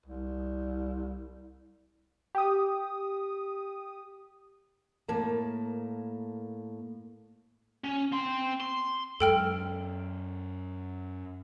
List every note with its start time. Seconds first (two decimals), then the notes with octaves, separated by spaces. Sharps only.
0.06 C2
2.35 G4 D#6
5.08 A2 A#3 A#4 A5
7.84 C#4
8.13 C4 C6
8.60 C6
9.20 F#2 G#3 A4 G5 F6